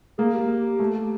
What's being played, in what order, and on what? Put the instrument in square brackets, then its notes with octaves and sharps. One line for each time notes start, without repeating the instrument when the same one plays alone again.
[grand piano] A#3 [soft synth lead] G#4
[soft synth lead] G4
[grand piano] A3